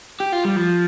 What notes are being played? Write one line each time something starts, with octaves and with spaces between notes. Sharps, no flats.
G4
F4
G3
F3